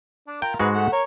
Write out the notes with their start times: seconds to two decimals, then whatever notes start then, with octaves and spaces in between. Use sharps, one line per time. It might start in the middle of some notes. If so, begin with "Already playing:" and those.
0.27 D4
0.42 F4 A#4 G5
0.59 G#2 G#3 F#4 G#4 B4
0.74 A3 F#5
0.92 A#4 C#5